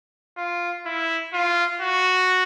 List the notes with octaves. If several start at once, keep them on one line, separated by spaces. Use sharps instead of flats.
F4
E4
F4
F#4